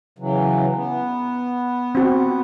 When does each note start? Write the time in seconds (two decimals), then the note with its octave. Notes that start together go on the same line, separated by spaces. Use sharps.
0.19 C#3 E3 F#3
0.75 B3
1.95 C4 F#4